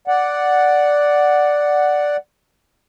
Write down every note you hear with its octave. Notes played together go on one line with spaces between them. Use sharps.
D5 F#5